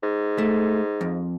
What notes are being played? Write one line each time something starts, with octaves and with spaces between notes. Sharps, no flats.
G#2
A3
F2